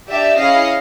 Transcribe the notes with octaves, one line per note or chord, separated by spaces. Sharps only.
D4 G4 D5 E5
C#4 E4 G#4 D#5 F5